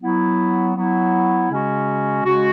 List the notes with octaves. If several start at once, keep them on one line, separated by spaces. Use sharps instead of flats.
F#3 B3 E4
F#3 B3 E4
C#3 G#3 C#4 F#4
C#3 G#3 C#4 F#4